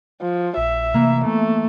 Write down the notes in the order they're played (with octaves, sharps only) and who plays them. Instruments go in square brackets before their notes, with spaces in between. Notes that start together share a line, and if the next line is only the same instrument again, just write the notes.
[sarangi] F3
[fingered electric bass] A#1 [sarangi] E5
[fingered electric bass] C3 A3 [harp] E3 A#3
[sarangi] A3 [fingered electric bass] B3